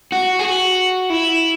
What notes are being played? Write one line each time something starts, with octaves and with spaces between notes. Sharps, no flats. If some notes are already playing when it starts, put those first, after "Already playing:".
F#4
G#4
F#4
E4